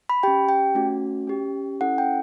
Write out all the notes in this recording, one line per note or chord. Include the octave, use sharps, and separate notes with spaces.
B5
C#4 G4 G5
G5
A3 C#4 F#4
C#4 G4
C#4 E4 A4 F#5
G5